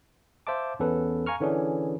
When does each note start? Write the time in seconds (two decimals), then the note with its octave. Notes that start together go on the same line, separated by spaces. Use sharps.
0.47 C5 E5 F5 A5 D6
0.80 E2 B3 C#4 A4 B4
1.26 F5 G#5 A#5 C#6 F6
1.40 D3 E3 C#4 D4 G#4